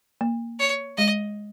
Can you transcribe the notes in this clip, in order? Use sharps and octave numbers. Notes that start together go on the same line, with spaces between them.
A#3
C#5
G#3 D#5